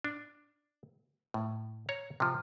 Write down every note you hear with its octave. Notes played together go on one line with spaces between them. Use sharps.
D4
A2
C#5 A#5
C3 F3